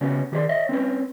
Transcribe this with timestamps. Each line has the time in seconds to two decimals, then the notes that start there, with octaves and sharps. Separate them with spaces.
0.01 C#3 B3 C#4 F#4 C#5
0.32 D#3 G4 G#4 C5 D5 C6
0.49 C#5 D#5 E5
0.69 C4 C#4 B4 C#5